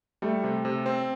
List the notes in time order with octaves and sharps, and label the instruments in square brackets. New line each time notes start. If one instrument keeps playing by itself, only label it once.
[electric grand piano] G3 [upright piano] A3
[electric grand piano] C3
C3
C4